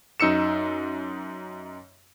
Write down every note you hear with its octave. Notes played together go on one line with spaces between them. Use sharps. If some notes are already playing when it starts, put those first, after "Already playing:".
F#2 D#4 E6 C#7 E7